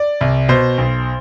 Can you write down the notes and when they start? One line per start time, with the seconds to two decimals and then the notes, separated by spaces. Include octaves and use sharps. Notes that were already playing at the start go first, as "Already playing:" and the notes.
Already playing: D5
0.21 C2
0.49 B2 C5
0.78 B1